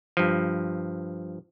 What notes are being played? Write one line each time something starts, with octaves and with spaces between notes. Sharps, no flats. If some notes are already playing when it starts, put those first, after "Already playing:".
G2 F3